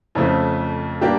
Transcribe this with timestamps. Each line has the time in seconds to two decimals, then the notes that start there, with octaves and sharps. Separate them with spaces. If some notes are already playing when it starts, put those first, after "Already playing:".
0.15 F2 C#3 F3 A3
1.01 G3 A#3 D4 G4